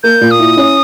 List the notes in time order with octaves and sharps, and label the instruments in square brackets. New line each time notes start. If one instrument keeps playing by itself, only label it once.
[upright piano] A#3 [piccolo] G6
[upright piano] A#2
[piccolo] D#6
[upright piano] E4
C#4